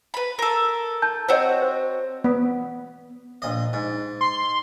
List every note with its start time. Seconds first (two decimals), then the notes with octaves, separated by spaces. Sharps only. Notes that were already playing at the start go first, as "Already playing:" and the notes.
0.14 B4 B5
0.39 A4 A#4
1.02 A5 G6
1.29 C4 F#4 C5 C#5 D#5
1.62 C5
2.24 B3
3.42 A#1 D#5
3.73 G#2
4.21 C6